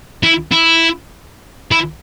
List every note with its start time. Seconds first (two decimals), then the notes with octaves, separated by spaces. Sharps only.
0.23 E4
0.52 E4
1.72 E4